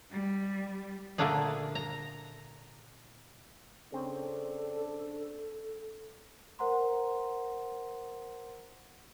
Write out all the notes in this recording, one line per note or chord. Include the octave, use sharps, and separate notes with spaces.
G3
A#2 D3 A3 A#3 D4 G#4
A#5
C#3 C4 D4 A4
A#4 C5 F#5 A#5 C6